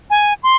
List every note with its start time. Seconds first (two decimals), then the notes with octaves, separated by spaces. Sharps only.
0.10 G#5
0.43 C6